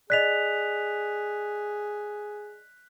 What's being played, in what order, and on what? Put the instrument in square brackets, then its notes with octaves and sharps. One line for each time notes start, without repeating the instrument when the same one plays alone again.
[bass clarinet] G#4 [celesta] D5 D#5 [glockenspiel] F#6 B6 F7